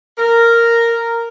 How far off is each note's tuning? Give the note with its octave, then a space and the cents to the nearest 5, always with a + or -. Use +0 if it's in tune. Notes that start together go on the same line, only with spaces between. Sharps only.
A#4 -5